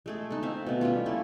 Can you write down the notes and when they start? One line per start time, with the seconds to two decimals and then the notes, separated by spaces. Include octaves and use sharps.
0.06 G#3 A3 G#4
0.30 D#4 A4
0.43 C4 E5 F5
0.66 B2 A3
0.81 G3 A3 C#4 F4
1.06 A3 A#3 E4 A4